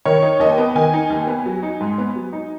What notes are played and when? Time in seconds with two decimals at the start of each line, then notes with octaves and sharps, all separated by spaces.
0.05 D#3 C#5
0.22 D#4
0.40 D#2 D#5
0.58 B3
0.75 D#3 G#5
0.93 D#4
1.10 D#2
1.27 B3
1.46 F#3
1.63 D#4
1.81 G#2
1.98 B3
2.16 F#3
2.33 D#4